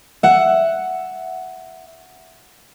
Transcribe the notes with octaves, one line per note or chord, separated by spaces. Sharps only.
E5 F#5